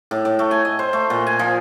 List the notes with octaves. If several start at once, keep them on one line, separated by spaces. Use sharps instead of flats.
A2
A2
A3
G#5
D#5
C5
A3
A#2
G#5
F3